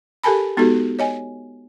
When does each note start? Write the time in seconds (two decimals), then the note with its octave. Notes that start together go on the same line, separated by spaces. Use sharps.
0.24 G4 A4 A#4 G#5 A5 B5
0.57 G#3 B3 D#4 F#4 G4 A4
0.99 C#5 D#5 G#5